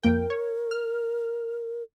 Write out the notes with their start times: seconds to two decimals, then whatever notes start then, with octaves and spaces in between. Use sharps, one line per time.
0.03 F2 A#3 A#4 G5
0.30 C#5
0.71 F6